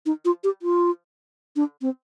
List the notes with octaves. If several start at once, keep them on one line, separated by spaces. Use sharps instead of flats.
D#4
F4
G4
F4
D4
C4